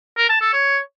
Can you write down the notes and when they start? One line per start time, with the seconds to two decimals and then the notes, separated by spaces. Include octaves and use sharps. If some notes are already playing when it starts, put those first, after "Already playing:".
0.18 A#4
0.29 A5
0.41 A4
0.53 C#5